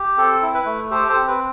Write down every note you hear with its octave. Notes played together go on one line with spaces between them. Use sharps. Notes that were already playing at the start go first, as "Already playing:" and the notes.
Already playing: G4
C4 A4
E4
B4
A3
G4 A4 C5
A4 C5
C4
B4